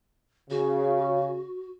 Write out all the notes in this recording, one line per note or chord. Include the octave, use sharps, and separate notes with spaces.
C#3 F#4